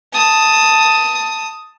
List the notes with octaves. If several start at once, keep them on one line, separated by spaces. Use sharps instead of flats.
A5 D#6